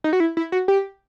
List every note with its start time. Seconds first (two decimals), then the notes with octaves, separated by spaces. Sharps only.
0.04 D#4
0.13 F#4
0.20 E4
0.37 E4
0.52 F#4
0.68 G4